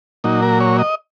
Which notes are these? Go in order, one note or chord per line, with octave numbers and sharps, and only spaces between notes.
A#2 F#3 D#4
A#4
C#5
D#5